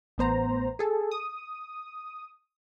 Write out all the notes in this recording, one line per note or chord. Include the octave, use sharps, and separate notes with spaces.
A1 B3 C5 A#5
G#4 A4
D#6